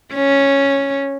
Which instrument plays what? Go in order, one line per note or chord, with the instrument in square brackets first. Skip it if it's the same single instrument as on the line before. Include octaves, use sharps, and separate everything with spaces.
[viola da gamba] C#4